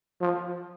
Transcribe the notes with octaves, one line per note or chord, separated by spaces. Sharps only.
F3